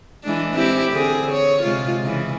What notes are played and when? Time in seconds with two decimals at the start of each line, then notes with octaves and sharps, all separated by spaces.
0.23 E3 G#3 D4
0.53 C4 E4 G4
0.92 D3 C4 G#4
1.32 C#5
1.63 C3 G#3 F4
2.03 C#3 E3